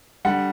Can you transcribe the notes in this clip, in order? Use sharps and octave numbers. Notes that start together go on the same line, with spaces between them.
D3 G3 F#5